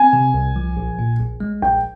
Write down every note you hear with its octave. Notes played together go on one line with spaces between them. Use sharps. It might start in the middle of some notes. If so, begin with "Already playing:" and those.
Already playing: C4 G#5
C3
C2
F3
A#1
A#2
A#1
G#3
A#1 G5